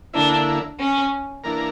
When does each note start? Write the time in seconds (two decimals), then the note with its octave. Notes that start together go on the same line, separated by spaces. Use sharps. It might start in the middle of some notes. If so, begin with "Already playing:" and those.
0.13 D3 A#3 D4 E4
0.79 C#4
1.44 E3 A#3 D4 A#4